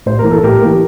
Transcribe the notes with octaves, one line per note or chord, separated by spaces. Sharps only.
A2 C5
A#4
E3 A#3
A4
A2 G4 A#4
E3 A#3